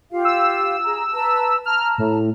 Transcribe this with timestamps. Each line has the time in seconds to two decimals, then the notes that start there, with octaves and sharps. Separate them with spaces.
0.11 F4 G4 F5
0.25 E6
0.84 G#4 A#5
1.13 B4 A5 A#5
1.66 A5 A#5 F6
1.98 A2